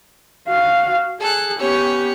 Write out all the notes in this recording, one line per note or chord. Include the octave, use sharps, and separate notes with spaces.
F#4 F5
G#4 A4 F#6
B3 C#4 G4 C#5